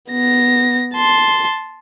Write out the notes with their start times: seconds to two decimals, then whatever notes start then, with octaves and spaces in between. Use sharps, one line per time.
0.11 B3 A#6
0.95 A5 C6